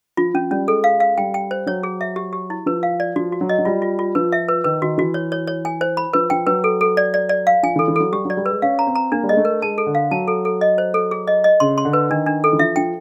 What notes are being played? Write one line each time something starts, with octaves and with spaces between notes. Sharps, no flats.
F3 F4
F3 C#4
G3 C#4
G#3 A4
F5
F5
G3 G5
G5
C5
F#3 C#5
G#4
E5
G4
G4
E4
F3 B4
F5
D5
F3 F#4
F#4
F#3
D#5
F#3
G3 F4
F4
F4
F3 B4
E5
B4
D#3 B4
D#3 F#4
E3 F#4
C#5
C#5
C#5
G#5
C5
B5
F3 B4
F3 G5
F#3 B4
A4
A4
D5
D5
D5
F5
F3 G#5
E3
A4
E3
F#3 A4
G3 G4
F#3 D5
G3
G#3 B4
C#4 F5
A#5
C4
A#5
A#3 D4
G3
G#3 D#5
A3
A#4
G#3 A5
A4
D3
F5
F#3 A5
A4
A4
D#5
C5
A4
G#4
D#5
D#5
C#3 C6
C6
D3
B4
D#3 D4
D4
A4
E3
F3 E5
F3 G5